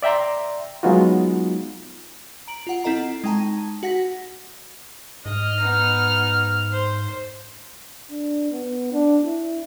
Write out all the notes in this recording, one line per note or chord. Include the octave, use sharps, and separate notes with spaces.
D5 E5 G5 A#5 C6
F#3 G#3 B3 D#4 F4 F#4
A#5 D7 F#7
F4 F#5
C4 E4 A4 D#5 A#5
G#3 D#4 G5 A5 A#5
F#4 F#5 A#6 B6
G#2 D#5 F6
B3 D#4
C5
D4
B3
D4
E4